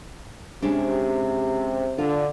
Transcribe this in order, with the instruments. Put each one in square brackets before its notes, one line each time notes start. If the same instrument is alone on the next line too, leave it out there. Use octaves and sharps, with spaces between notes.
[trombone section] C3 [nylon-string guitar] G#3 C#4 D4
[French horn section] D3 [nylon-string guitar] F4